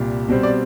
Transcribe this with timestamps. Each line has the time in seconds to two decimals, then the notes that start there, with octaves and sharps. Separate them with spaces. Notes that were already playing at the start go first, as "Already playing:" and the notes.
Already playing: C2 A#2 G3
0.28 B2 G3 C4
0.43 D5